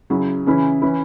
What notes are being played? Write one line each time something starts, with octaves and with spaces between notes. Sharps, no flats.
C#3 F#3 E4
C#3 E3 C#4 E4
E3 C#4 E4